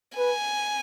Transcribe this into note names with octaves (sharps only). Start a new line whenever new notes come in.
B4 G#5